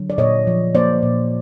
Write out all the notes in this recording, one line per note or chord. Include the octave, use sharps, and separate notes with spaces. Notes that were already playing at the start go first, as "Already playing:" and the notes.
Already playing: D3 F#3
D5
A#2 C#5 D#5
F3
A#3 C5 D5
A#2